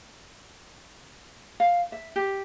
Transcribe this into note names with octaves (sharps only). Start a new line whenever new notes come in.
F5
E5
G4